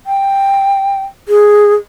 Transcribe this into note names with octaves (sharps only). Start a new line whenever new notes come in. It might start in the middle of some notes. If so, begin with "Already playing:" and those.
G5
G#4